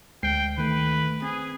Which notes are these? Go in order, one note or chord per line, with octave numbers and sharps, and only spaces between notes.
D2 G#3 G5 C7
D#3 A3 B4
C4 G#4